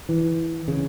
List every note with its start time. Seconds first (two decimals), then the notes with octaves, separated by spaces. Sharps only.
0.09 E3
0.68 C#3